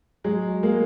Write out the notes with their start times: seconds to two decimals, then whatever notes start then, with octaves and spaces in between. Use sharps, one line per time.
0.24 F#3 G#3
0.63 G#3 A#3